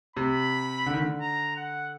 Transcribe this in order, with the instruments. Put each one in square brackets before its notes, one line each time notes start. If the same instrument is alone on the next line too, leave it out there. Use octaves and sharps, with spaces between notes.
[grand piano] C3 [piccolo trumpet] B5
[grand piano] D3
D#3
D3
[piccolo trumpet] A#5
F#5